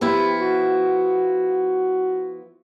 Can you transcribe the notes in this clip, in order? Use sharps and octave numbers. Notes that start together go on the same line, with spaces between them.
F3 B3 E4 G4
F#4